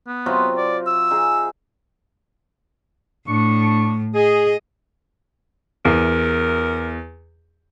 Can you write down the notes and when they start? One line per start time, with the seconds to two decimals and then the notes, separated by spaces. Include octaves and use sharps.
0.07 B3
0.26 C3 F#3 F4
0.57 D5
0.86 E6
1.11 D#4 G#4
3.28 A2 D4 C#6
4.15 G#4 D#5
5.85 E2 A#4